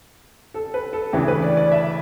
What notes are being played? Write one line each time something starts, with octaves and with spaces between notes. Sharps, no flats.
A4
B4
A4
D2 C#3 E3 G4
B4
D5
D5
E5